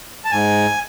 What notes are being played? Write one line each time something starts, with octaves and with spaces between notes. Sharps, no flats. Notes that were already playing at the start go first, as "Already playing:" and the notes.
A5
G#2 G#5